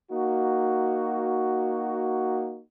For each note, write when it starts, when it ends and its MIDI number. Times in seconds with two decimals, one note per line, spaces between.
0.10 2.61 58
0.10 2.61 63
0.10 2.61 66